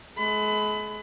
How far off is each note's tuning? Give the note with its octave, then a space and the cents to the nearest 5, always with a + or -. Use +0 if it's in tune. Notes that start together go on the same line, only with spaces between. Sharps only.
G#3 +40 B5 +25